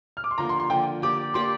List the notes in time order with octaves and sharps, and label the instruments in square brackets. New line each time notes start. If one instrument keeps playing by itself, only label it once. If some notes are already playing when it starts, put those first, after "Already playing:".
[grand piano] F6
D6
C6
[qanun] D3 F3 A#3 [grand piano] A#5
[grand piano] C6
C6
[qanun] D3 F3 A#3 [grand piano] G5
[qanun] A#3 G4 D5 [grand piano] D6
[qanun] A#3 G4 D5 [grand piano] C6